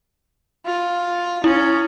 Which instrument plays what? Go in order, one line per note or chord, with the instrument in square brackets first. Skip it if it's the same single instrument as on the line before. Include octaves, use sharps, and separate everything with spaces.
[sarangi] F4
[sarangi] C#4 [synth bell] E4